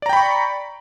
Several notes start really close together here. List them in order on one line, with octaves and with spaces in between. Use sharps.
D5 A#5 G5 B5 C#6